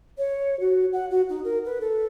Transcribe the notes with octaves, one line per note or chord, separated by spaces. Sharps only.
C#5
F#4
F#5
F#4
D#4
A#4
B4
A4